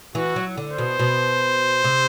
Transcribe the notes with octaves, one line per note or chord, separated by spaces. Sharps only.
E3 F#4
F#3
D3
C5
B2
B2
C3